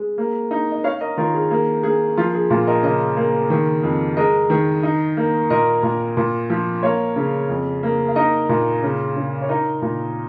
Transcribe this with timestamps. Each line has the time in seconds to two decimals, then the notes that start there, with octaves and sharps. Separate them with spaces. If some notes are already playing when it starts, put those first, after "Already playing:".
Already playing: G#3
0.18 A#3
0.51 D#4
0.72 D#5
0.84 C#4 C#5 F5
1.01 A#4 D#5
1.17 D#3 F4 A#4
1.34 G#4
1.51 A#3 G#4
1.83 A#3 G#4
2.17 F3 F4
2.34 G#4
2.50 A#2 F4
2.67 A#4 D#5
2.83 C#3 A#4 D#5
3.17 A#3
3.50 D#3
3.83 F2
4.17 G#3 A#4 D#5
4.50 D#3
4.83 D#4
5.17 A#3
5.50 A#2 A#4 D#5
5.83 A#2
6.17 A#2
6.50 F3
6.83 A#3 C#5 F5
7.16 C#3
7.49 F2
7.83 A#3
8.08 F5
8.16 D#4 A#4 D#5
8.49 A#2
8.83 C#3
9.16 C#3
9.42 C#5
9.49 D#4 A#4 D#5
9.82 A#2